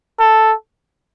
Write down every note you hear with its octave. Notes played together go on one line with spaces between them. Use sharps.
A4